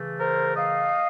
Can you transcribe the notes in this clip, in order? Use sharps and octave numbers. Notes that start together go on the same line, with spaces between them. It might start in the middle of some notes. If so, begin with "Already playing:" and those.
Already playing: C#3 E3 A3
A#4 C5
D#5 F5